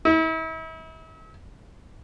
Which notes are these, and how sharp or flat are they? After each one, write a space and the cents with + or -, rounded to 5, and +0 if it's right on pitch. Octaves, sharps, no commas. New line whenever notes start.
E4 -40